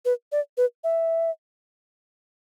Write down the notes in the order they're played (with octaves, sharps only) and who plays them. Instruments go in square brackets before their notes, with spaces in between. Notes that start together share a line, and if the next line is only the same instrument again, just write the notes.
[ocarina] B4
D5
B4
E5